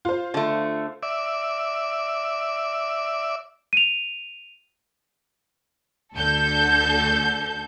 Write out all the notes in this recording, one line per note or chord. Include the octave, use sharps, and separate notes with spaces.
F4 C5
D3 A3
D5 E5
D#7 F7
D2 D3 A4 G6